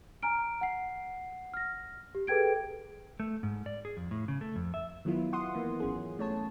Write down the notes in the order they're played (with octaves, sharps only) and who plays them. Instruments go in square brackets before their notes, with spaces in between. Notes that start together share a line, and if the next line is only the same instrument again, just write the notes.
[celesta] G#5 A#5 F6 D7
F#5 C7
F6 A#6
G4
G#4 A4 B4 G5 G#6 D7
[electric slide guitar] A3
G#2
D5
G#4
F2
A2
C#3
A3
F2
E5
[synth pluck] D#3 F#3 B3 E4 F4
F#5 C6 D#6
E3 A#3 B3
G#1 C#4 G#4
A3 C#5 A5